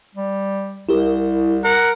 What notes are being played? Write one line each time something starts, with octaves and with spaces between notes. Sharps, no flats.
G3
C2 E4 G4 A#4
A#4 F#5